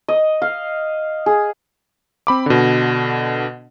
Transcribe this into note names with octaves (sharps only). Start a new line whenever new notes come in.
D#5
F5
G#4
C4 B5 D6
B2 D3